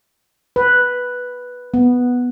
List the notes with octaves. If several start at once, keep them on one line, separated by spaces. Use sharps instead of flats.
B4
B3